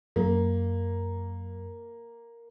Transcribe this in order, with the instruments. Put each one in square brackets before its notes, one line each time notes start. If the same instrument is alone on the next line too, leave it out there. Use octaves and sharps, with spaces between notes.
[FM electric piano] F#2 [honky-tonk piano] A#3